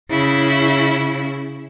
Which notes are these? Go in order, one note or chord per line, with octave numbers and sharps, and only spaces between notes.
C#3 E4